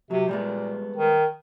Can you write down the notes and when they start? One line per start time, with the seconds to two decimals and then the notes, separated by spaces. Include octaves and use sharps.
0.11 C3 F#3
0.29 A#2 G3 G#3 B3
0.96 D#3